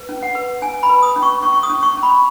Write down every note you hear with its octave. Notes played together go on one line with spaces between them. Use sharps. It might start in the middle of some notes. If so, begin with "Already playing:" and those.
Already playing: B4
C#4
F#5
B4
C#4 G#5
B5
B4
D#6
C#4
C#6
C#4 C#6
C#6
D#6
C#4
C#6
C#4
B5